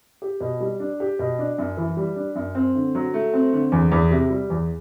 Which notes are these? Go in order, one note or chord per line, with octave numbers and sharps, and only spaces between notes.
G4
B2
G3
D4
G4
B2
D4
F#2
E3
G3
D4
F#2
C4
D3
F#3
A3
C4
D3
E2
E2
C3
G3
E2